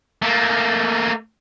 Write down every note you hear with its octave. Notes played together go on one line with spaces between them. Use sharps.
A3 A#3